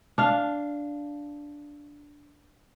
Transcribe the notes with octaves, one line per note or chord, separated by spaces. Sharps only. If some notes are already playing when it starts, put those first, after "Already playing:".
D4 F5